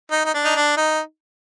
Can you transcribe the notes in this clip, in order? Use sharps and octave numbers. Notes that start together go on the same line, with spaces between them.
D#4
D#4
D4
D#4
D4
D#4